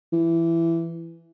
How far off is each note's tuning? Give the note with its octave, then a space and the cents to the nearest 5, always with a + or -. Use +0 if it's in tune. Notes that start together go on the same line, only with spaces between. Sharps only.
E3 +15